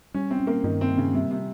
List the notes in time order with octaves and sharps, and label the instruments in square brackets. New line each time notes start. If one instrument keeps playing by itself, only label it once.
[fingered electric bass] G3 [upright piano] C#4
[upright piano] C4
[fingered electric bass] C#4
[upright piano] A#3
[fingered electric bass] G2 [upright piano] D#3
[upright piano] C4
[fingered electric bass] A#3
[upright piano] C#3
[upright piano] C3 [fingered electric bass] G3
[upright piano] C3